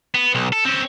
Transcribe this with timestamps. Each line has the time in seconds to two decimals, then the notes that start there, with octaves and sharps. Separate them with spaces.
0.14 B3
0.35 B1
0.53 A4
0.65 C4 C#4